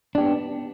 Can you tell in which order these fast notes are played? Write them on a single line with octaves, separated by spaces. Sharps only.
D4 G4 B3